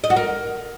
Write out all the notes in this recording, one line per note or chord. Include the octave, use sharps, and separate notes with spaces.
D#5
F#4
A#4